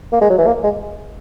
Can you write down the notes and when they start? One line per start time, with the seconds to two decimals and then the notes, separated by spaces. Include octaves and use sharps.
0.12 A#3
0.21 G#3
0.30 F#3
0.38 E3
0.47 A#3
0.64 G#3